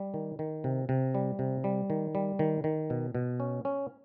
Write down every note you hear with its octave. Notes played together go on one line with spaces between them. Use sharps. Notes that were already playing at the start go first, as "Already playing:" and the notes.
Already playing: G3
D#3
D#3
C3
C3
G3
C3
G3
D#3
G3
D#3
D#3
B2
B2
C#4
C#4